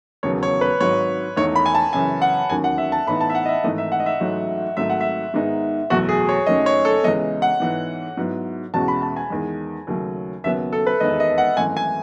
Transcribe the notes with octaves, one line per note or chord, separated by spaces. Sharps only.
E1 D#2 C#3 F#3 B3 C#5
C#5
B4
G#1 G#2 F#3 C#5
E1 E2 D#3 A3 D#4 C#5
B5
G#5
A5
F#2 C#3 E3 G#5
F#5
E1 D#2 D#3 F#3 C#4 G#5
F#5
E5
A5
A2 E3 B3 D#4 B5
A5
E5
F#5
D#5
E5
G#1 G#2 E3 A3 D#4 D#5
E5
F#5
D#5
E5
A1 G#2 F#3 A3
G#1 G#2 F#3 A3 E5
F#5
E5
G#2 D#3 G#3 B3 D#4
F#1 E2 B2 F#3 A3 F#4
G#4
C#5
F#1 F#2 D#3 A3 C#4 D#5
C#5
A4
C#2 C#3 E3 G#3 B3 D#5
F#5
G#2 E3 B3
G#2 F#3 B3 E4
E2 B2 G#3 C#4 F#4 A5
B5
A5
G#5
E2 D#3 G#3
D#2 C#3 F#3 A3 C#4
D#2 C#3 F#3 B3 E5
A4
B4
E1 D#2 D#3 G#3 B3 D#5
D#5
F#5
G#1 F#2 E3 A3 G#5
G#5